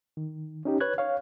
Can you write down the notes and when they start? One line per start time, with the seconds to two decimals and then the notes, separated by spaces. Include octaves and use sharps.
0.17 D#3
0.65 C#4 D#4 G4
0.80 B4 C#5 F#6 G#6
0.98 C#5 F5